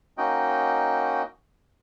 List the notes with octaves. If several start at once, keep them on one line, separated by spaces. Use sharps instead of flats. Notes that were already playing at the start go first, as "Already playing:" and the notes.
A#3 C#4 D#4 F#4 D#5 G5